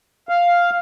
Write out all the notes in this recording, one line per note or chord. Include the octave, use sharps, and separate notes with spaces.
F5